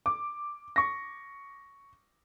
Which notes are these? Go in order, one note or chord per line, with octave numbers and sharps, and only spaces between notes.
D6
C#6 A#6